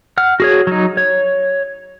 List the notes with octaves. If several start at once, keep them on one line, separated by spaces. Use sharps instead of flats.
F#5 F6
F#4 G#4 C#5
F#3 D#4
C#5